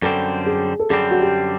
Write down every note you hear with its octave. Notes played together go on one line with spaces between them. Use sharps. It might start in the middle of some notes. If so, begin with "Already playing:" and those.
F#2 D3 G3 C4 A4
G#4
A4
F#2 D3 G3 C4 G#4
F#4
G4